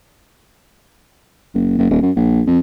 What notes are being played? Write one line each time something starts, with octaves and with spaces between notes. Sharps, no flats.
F#1
F#1
D#1
F#2
A#1
F2